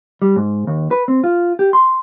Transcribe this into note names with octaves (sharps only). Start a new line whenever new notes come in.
G3
G#2
D#2
B4
C4
F4
G4
C6